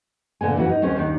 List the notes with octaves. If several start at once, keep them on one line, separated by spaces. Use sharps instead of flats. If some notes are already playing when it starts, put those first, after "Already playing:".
A#2 D3 B3 G#5
F2 E3 C#4 F#4
D#4
D#2 C4 C#4 A#4 C5
D#2 D#3 D4